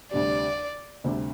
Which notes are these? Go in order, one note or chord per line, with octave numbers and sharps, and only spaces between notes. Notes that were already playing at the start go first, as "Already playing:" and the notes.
D2 C3 G3 D4 G4 D5
D2 C3 G3 D4 G4